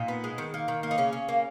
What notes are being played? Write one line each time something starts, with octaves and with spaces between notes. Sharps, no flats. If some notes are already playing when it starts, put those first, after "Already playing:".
Already playing: A#2 D#4
B3
G#3
D#3
A#3
D#3
A#3
D#4
C#3 C#4
C#3
A#3